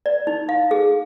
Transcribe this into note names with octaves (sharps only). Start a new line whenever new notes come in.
D5
D#4
F5
G#4